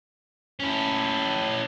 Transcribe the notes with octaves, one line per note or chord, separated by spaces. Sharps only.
C#4 E4